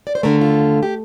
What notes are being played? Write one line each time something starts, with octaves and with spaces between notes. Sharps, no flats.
D5
C5
D#2 D3 A3 A#4
F4
G4